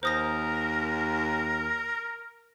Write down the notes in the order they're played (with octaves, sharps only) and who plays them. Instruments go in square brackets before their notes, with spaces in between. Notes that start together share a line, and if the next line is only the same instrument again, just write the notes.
[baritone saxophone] D#2 [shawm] A#4 [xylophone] C5 D#6 A#6